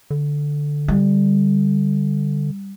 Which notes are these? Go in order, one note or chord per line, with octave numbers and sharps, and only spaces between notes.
D3
G3